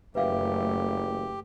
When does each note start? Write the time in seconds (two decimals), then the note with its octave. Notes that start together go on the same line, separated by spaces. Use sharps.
0.15 F#1 F#2 E3 A3 G4 B4 E5 F5